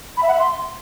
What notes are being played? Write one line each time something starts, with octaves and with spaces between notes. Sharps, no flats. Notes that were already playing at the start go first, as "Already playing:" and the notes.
B5
E5
F#5
E5
C6